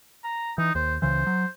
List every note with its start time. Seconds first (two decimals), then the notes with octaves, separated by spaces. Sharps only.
0.24 A#5
0.58 E3 D#4
0.75 D#2 C5
1.02 C#2 C#3 E3 C5
1.27 F#3